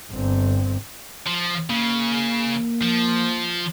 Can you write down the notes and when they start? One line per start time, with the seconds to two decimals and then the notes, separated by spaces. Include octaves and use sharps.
0.11 G1 C4
1.27 F3
1.70 C#3 A#3
2.82 F3